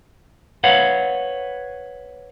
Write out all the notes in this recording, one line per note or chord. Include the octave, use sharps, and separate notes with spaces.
B4 C#5 F5 F#5